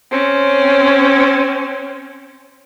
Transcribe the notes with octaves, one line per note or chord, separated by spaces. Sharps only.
C4 C#4